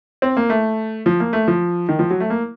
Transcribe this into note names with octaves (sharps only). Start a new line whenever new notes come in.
C4
A#3
A3
F3
A#3
A3
F3
D#3
F3
F#3
A3
A#3